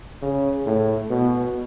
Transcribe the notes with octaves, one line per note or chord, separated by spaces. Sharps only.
C#3
A2
B2